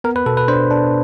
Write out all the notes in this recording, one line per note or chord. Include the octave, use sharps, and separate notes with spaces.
B3 A#4
B4
B2 A4
B4
D4 C5
D4